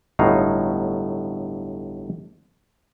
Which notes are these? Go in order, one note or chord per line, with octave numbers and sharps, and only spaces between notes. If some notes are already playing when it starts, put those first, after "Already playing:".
G1 A2 F#3 D#4 F5